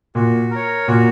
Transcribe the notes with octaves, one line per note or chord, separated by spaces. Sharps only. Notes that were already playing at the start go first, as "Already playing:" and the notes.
A#2 F#4
A#4 C#5
A#2 F#4